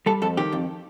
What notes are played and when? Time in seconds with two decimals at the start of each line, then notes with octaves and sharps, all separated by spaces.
0.06 G3 A4
0.22 F2 A4
0.37 D#3 G4
0.52 F2